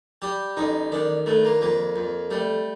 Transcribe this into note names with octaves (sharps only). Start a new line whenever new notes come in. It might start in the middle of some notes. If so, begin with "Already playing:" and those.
G3 G4
A1 D#4
D#3 D4
G2 A3
A#3
F2 A#3
F2
G3 A3